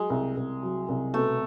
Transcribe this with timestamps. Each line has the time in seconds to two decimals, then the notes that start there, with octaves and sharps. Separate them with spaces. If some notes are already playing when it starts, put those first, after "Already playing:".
Already playing: F#3 G#3
0.10 C2
0.37 C2
0.63 F#3
0.89 C2
1.14 B2 A3